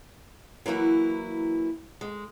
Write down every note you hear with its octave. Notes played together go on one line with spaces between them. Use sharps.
E3 F#3 A#3 E4
G#3